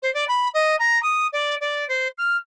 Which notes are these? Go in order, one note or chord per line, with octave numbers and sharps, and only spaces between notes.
C5
D5
B5
D#5
A#5
D#6
D5
D5
C5
F6